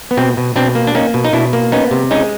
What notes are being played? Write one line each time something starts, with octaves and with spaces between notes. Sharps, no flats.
B3
B2 C4
B2
B2 C4 D4
A#3
D4
A#3 C#4 D#4
B2
D#4
B2 D4 E4
A#3
B3 C#4 D#4
C3
G#3 C#4 D#4